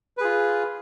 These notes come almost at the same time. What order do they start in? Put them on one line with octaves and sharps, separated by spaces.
B4 G#4 F4